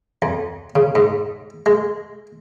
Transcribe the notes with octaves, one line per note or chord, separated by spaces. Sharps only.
F2
C#3
G#2
G#3